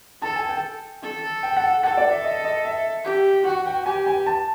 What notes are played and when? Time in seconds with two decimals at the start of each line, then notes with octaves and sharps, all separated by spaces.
0.22 A4 A5
0.36 G#5
0.49 G5
1.03 A4
1.43 G5
1.57 F#5
1.83 A4 F#5
1.97 D5
2.11 E5
2.24 D#5
2.44 D#5
2.65 E5
3.05 G4
3.45 F#4 F#5
3.66 G5
3.86 G4 G#5
4.07 G#5
4.26 A5